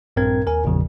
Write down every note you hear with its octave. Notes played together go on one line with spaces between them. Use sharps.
A#1 G2 A#2 C4 A#4 G#6
D#2 A#4 G#5
G#1 E2 A#2 C#3 F3